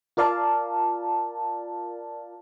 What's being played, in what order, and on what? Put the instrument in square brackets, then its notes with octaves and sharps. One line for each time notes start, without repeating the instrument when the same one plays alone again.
[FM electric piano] F4 A#4 D5 F5 A5